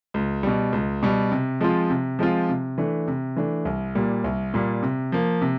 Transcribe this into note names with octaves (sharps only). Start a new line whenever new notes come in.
C#2
B2 G3
C#2
B2 G3
C3
F3 G#3 C4 F4
C3
F3 G#3 C4 F4
C3
E3 A3 D4
C3
E3 A3 D4
C2
A#2 G3 A#3
C2
A#2 G3 A#3
C3
F3 A#3
C3